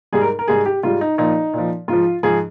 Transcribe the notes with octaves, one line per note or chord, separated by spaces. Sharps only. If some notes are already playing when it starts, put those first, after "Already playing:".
G#2 G3 G#4
A#4
A#4
G#2 G3 G#4
G4
G#2 G3 F4
D#4
A#2 F3 D#4
A#2 F3
G#2 F3 F4
G#2 F3 G#4